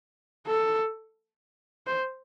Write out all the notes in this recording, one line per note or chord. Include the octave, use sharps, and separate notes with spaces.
A4
C5